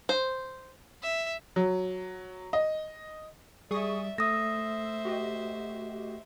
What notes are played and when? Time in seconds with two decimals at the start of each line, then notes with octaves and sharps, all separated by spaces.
0.09 C5
1.03 E5
1.56 F#3
2.53 D#5
3.71 G3 G#4 D5 E5 C#6 D#6
4.18 A3 C5 E5 D#6 E6 A#6
5.05 F#4 G4 D#5